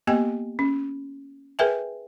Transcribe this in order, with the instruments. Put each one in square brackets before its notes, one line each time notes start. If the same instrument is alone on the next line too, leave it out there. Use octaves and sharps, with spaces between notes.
[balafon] A#3 B3 G4 D#5 G5 G#5
C#4
G#4 A#4 B4 E5 G5 G#5